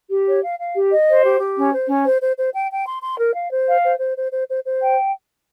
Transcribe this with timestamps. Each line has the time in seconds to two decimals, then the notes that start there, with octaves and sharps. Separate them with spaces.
0.10 G4
0.27 C#5
0.43 F5
0.59 F5
0.75 G4
0.91 D#5
1.08 C5
1.23 G4
1.40 G4
1.57 C#4
1.72 C5
1.88 C#4
2.05 C5
2.21 C5
2.37 C5
2.54 G5
2.70 G5
2.86 C6
3.03 C6
3.18 A#4
3.35 F5
3.51 C5
3.67 F5
3.84 C5
3.99 C5
4.16 C5
4.32 C5
4.49 C5
4.64 C5
4.81 G5